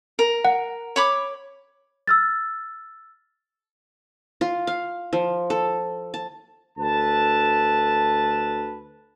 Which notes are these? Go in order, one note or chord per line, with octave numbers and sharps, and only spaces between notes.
A#4
F#5
C#5 B5 D6
E6 F6 A6
F4
F5
F3
A4
A5
D2 A4 B4 A5